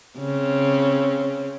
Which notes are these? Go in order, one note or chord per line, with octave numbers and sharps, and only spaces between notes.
C#3 C4